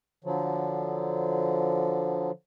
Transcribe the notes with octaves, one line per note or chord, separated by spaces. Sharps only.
D3 F3 F#3